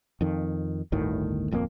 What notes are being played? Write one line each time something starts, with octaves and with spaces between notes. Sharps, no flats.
F2 D#3
G1 D2 A2 D#3
D1 F2 F3 A#3